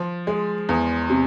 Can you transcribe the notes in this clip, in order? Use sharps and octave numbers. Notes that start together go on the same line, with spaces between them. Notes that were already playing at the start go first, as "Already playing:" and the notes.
Already playing: F3
G#3
E2
C3